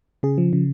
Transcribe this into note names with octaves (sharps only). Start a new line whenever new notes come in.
C#3 G#4
F3
C#3